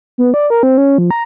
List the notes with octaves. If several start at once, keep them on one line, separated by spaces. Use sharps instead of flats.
B3
D5
A#4
C4
C#4
F3
A#5